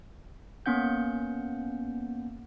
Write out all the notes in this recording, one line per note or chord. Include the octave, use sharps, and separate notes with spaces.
A#3 B3 C#4 F#5 G6